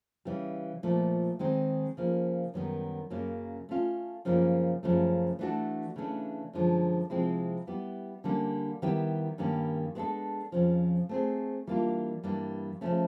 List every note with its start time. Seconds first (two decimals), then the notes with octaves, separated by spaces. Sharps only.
0.25 C#3 E3 G3
0.83 A#2 F3 A3
1.39 D#3 G#3 C4 D#4 G#4
1.97 C#3 F3 A#3
2.54 F#2 D#3 G3 B3
3.10 F#2 C#3 F#3 A#3
3.69 A3 C#4 F4
4.25 F#2 C#3 F3 A#3 D#4
4.83 F#2 C#3 F3 A3
5.39 E3 A3 D4 F#4 A4
5.96 C#3 E3 A3 D4
6.53 F#2 D3 F3 G#3
7.10 C3 F3 G#3 C4 E4
7.67 G3 B3 E4 G4
8.24 D3 G3 A#3 C#4
8.82 D#3 G3 B3 E4 G4
9.38 G2 D#3 G3 A#3 C#4
9.95 G#3 B3 D4 F#4 A4
10.52 F2 C#3 F3
11.09 A3 C4 D#4 G#4 C5
11.67 E3 G3 A#3 D4 F4
12.24 G2 E3 G3 A#3
12.81 C#3 F3 A3 C#4